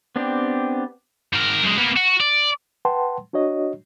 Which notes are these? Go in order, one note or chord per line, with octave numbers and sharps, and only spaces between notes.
B3 C4 D4 G4
G#2 A#4
F#2 G#3
A#3 B3
F#4
D5
B4 F#5 G5 A5 C6
D4 F#4 C#5 D#5